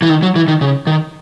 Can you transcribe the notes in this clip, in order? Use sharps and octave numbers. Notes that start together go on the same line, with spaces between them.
E3
D#3
F#3
E3
D#3
C#3
D#3